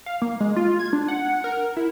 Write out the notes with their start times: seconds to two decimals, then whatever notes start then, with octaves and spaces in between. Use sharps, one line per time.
0.06 F5
0.22 A#3
0.40 G#3
0.56 F4
0.79 G#6
0.93 D4
1.08 F#5
1.44 A#4
1.77 E4